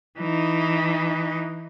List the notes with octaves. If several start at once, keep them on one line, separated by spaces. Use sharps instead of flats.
E3 D#4